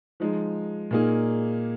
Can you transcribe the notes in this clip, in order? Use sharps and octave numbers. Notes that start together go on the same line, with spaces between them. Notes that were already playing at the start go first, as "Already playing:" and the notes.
F3 G#3 D#4
A#2 A#3 D#4 G#4